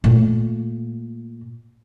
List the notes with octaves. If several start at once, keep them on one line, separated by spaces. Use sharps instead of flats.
A#2 A3